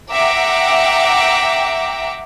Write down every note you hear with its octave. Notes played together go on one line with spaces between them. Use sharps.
E5 F#5 G5 A#5 D6